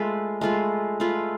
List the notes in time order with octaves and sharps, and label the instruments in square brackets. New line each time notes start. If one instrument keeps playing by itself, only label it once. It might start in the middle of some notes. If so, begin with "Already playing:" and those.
Already playing: [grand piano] G#3 [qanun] A3 F4 B4
[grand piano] G#3 [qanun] A3 F4 B4
[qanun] A3 F4 B4